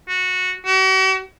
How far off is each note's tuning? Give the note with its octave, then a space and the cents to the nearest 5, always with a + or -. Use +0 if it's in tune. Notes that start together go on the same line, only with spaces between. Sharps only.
F#4 -10
F#4 +45